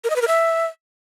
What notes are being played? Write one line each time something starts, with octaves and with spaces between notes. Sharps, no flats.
A#4
D#5
B4
A#4
E5